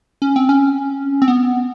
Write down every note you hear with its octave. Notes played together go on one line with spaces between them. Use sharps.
C#4
C4
C#4
C4
B3